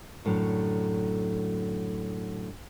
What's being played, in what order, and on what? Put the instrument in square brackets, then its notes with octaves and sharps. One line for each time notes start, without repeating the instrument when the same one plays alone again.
[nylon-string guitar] F#2 A2 D3 F#3